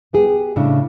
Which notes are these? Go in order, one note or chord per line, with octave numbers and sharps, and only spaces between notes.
B3 G4 G#4
A2 C#3 A3 D4